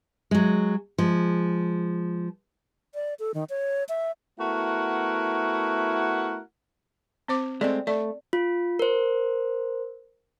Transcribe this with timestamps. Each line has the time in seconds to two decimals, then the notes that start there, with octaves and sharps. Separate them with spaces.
0.31 F#3 G#3
0.98 F3 G#3
2.95 D5
3.19 A4
3.34 D#3
3.50 C#5
3.89 E5
4.39 A3 B3 E4 F#4 A#4 F#5
7.28 C4 C5 D6
7.61 G#3 A3 C4 D5
7.87 A3 D5
8.33 F4
8.79 A#4 C5